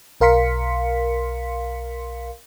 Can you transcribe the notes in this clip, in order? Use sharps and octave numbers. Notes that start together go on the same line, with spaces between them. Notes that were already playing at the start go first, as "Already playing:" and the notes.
B1 A#4 F5 C6 B6 C#7